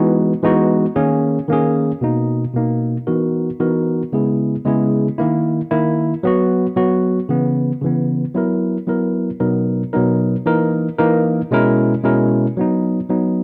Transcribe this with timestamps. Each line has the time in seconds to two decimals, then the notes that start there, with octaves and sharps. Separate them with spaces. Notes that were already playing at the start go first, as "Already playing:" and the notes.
Already playing: E3 G#3 B3 D#4 F#4
0.43 E3 G#3 B3 D#4 F#4
0.96 D#3 A#3 C#4 G#4
1.49 D#3 A#3 C#4 G#4
2.01 B2 A#3 D#4
2.54 B2 A#3 D#4
3.07 E3 B3 D#4 F#4 A#4
3.60 E3 B3 D#4 F#4 A#4
4.12 C#3 G#3 B3 E4 G#4
4.65 C#3 G#3 B3 E4 G#4
5.18 D#3 A#3 E4
5.71 D#3 A#3 E4
6.23 F#3 B3 F#4
6.76 F#3 B3 F#4
7.29 C#3 E3 B3
7.82 C#3 E3 B3
8.35 F#3 B3 E4 A#4
8.87 F#3 B3 E4 A#4
9.40 B2 F#3 B3 D#4 A#4
9.93 B2 F#3 B3 D#4 A#4
10.46 E3 A#3 D#4 A#4
10.98 E3 A#3 D#4 A#4
11.51 B2 G#3 C#4 E4 A#4
12.04 B2 G#3 C#4 E4 A#4
12.57 F#3 B3 D#4
13.09 F#3 B3 D#4